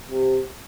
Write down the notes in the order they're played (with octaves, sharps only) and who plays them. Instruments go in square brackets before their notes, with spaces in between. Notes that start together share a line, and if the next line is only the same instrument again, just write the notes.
[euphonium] C3